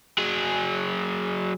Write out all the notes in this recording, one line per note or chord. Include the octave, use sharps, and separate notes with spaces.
F#3 G#4